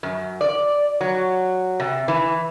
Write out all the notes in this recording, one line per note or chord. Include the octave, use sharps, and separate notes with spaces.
F#2
D5
F#3
C3
E3